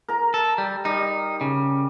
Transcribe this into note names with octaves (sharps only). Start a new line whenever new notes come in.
A#4 A#5
A4
G3
G3 D#4
C#3